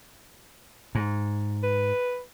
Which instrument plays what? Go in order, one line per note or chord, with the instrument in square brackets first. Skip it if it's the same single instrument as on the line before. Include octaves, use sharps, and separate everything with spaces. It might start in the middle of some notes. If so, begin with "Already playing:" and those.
[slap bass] G#2
[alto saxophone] B4